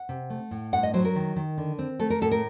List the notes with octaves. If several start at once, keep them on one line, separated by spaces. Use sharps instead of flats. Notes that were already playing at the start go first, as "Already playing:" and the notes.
Already playing: F#5
C3
A3
A2
G2 F#5
D#5
F#3 C5
A#4
D#3
D#3
D3
C4
A3 A4
A#4
A2 A4
A#4